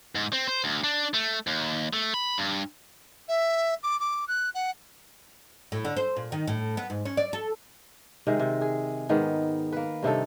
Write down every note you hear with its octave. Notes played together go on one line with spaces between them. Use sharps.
G#2
C4
C5
D2
D4
A3
D#2
A3
B5
G2
E5
D6
D6
F#6
F#5
A2
D3
C5
A#2
D#3
A2
B3
G#2
C#4
D5
A4
C3 D#3 G#3
C3
G#4
G#2 D#3 B3
A#3 B4
G2 C3 D#4 A4